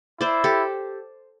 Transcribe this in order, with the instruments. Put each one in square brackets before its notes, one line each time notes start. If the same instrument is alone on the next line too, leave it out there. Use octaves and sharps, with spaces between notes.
[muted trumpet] E4 [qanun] C5 D5
[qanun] G4 A4